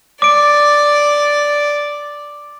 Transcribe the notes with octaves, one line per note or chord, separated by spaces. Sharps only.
D5 D6 D7